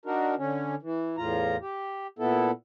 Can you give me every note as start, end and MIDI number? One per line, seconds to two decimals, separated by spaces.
0.06 0.35 62
0.06 0.35 63
0.06 0.35 66
0.06 0.35 70
0.38 0.75 50
0.38 0.75 61
0.82 1.16 52
1.17 1.57 40
1.17 1.57 45
1.17 1.57 65
1.17 1.57 82
1.61 2.07 67
2.19 2.51 46
2.19 2.51 59
2.19 2.51 64
2.19 2.51 69